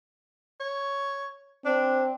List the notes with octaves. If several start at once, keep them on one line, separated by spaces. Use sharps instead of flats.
C#5
C4 D4